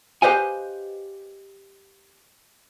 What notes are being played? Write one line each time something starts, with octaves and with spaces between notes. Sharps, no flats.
G4 B4 C5 D#5 F5 G#5